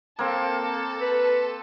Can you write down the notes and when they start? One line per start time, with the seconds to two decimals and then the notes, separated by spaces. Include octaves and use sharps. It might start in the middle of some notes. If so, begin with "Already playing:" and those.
0.19 A#3 C4 A4
1.01 B4